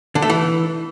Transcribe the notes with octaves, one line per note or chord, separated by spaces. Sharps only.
D3
A3
E3